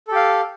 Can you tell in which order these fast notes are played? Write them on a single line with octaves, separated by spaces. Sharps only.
A4 G4 F5